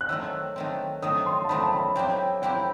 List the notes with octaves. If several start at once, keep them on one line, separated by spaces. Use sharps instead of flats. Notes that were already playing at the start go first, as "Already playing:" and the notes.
F#6
D#3 F#3 A3 C4 E6
D#3 F#3 A3 C4
D#3 F#3 A3 C4 D#6
C6
A5
D#3 F#3 A3 C4 B5
A5
B5
F#3 C4 E4 G4 G5
F#3 C4 E4 G4 G5